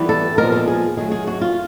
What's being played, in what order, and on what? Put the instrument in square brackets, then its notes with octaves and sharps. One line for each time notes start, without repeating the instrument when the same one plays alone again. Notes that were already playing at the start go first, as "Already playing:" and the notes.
Already playing: [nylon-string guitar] E3 G3 B3
A4
A#2 F3 G#3 B3 A#4
A4
G#4
D#3 F#3 A3 G#4
G#4
F#4
F4